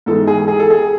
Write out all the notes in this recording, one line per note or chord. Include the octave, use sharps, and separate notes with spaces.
G#2 E3 G#3 A4
G#4
G#4
A4
G#4